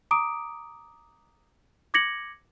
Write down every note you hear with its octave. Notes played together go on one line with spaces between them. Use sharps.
A#5 D6 D#6 D7
D6 G#6 A#6 C#7 F#7